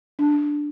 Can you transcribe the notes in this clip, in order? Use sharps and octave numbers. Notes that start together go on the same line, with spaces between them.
D4